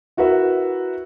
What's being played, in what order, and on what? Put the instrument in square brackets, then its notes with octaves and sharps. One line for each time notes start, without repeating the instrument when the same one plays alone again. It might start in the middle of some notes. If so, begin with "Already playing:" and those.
[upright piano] E4 F#4 A#4 B4 E5